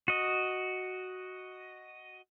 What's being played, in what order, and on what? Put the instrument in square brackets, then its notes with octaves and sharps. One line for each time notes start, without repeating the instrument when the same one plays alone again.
[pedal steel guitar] F#4 D#5